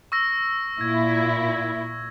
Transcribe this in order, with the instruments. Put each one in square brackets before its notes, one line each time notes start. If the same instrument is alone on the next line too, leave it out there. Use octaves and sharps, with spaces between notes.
[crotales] C#6 E6 A#6
[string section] A#2 E4 [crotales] G#6